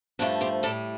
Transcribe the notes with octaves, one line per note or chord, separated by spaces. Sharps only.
G2 F3 A3 D4
G4 C5
A2 G3 A4 D5